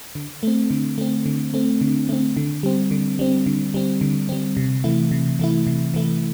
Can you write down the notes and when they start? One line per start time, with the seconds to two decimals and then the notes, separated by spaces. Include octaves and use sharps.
0.15 D3
0.43 A3 C4
0.70 D3
0.98 A3 C4
1.26 D3
1.54 A3 C4
1.81 D3
2.09 A3 C4
2.37 D3
2.63 G3 C4
2.91 D3
3.19 G3 C4
3.46 D3
3.74 G3 C4
4.01 D3
4.29 G3 C4
4.57 C3
4.84 E3 A3 E4
5.11 C3
5.39 E3 A3 E4
5.67 C3
5.94 E3 A3 E4